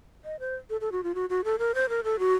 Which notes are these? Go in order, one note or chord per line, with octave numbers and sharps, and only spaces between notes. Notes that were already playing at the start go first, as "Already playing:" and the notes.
D#5
C5
A4
A4
F#4
F4
F#4
F#4
A4
A#4
C5
A#4
A4
F#4